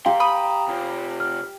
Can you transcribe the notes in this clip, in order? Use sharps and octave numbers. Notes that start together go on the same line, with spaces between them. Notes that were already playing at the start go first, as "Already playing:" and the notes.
G4 F5 A#5 C6
B5 D#6
C3 F4
F6